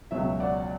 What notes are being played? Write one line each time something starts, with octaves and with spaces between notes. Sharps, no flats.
C#2 B2 F#3 E5
D5 F#5